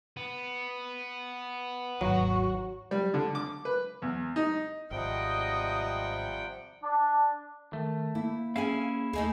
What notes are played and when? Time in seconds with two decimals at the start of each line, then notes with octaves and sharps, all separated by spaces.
0.17 B3
2.01 G#1 D#2 F#3 F#4
2.91 G3
3.14 D3
3.35 D6
3.65 B4
4.02 E2
4.36 D#4
4.91 G#1 C3 F3 G3 D#5 F#5 G5
6.84 D4
7.73 D#3 A3
8.15 A#3 E4
8.56 C#4 E4 G#4 F5 G#5
9.13 D#2 A3 D#4 G#4